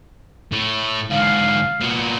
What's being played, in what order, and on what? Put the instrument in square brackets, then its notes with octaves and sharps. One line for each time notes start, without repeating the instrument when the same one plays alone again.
[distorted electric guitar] A2
[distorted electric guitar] G#2 D3 [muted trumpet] F5
[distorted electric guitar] A#2 B3